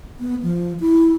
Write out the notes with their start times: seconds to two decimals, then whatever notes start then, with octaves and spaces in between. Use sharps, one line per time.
0.20 B3
0.42 F3
0.80 E4